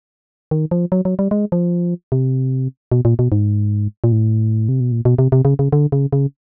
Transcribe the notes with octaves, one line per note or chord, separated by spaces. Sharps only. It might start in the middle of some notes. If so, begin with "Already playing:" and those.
D#3
F3
F#3
F#3
G3
G#3
F3
C3
B2
A#2
B2
G#2
A#2
A2
C3
B2
A#2
B2
C3
C3
C#3
C#3
D3
C#3
C#3